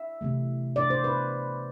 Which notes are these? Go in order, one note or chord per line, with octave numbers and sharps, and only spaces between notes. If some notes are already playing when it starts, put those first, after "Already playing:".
Already playing: E5
C3 E3 A3
D5
C5
B4